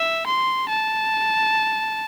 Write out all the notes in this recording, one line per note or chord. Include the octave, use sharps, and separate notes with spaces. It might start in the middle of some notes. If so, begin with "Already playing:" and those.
Already playing: E5
C6
A5